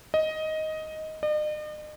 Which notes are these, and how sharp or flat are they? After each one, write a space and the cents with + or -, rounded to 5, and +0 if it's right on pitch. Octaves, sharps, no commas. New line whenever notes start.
D#5 +10
D#5 -45